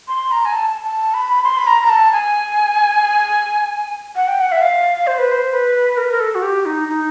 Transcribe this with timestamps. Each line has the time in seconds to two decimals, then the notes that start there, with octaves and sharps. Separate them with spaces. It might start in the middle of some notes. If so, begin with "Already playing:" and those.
0.08 C6
0.32 A#5
0.45 G#5
0.54 A5
0.84 A5
1.14 B5
1.44 C6
1.58 B5
1.67 A#5
1.83 A#5
1.89 A5
2.12 G#5
4.16 F#5
4.28 G5
4.41 F#5
4.52 E5
4.62 F5
5.07 C5
5.19 B4
5.31 C5
5.52 B4
5.98 A#4
6.05 B4
6.12 A#4
6.20 A4
6.35 F#4
6.42 G4
6.65 D#4
6.88 D#4